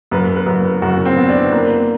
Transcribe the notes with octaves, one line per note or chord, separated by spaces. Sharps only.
F#2 B4
B4
F#2
F#2 F#4
C4
B3
D4
A#3